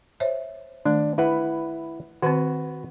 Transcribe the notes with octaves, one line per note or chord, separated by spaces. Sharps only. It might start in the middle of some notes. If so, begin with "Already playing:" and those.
C5 C#5 E5
D#3 A3 D4
E4 B4 F#5
D#3 C4 F#4 B4